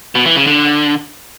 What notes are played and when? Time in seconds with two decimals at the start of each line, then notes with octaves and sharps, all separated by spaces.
0.15 B2
0.26 E3
0.36 C#3
0.47 D3